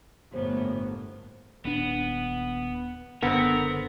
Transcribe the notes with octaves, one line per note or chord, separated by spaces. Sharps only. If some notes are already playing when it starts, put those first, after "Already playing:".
G1 A2 A#3 B3 C5 C#5
D#1 B3 D4
F#1 B2 D3 B3 C4 A#4